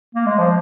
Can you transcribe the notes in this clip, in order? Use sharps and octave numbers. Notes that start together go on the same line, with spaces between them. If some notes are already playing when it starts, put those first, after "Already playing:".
A#3
G#3
F3